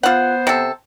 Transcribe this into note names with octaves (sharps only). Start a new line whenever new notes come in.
B3 F4 C5 F#5
C3 A4